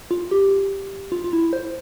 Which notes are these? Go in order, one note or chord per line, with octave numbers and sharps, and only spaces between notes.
F4
G4
F4
F4
E4
C5